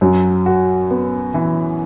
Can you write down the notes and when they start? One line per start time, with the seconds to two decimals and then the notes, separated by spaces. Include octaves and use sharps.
0.01 F#2 F#3
0.46 F#4
0.91 B3
1.34 E3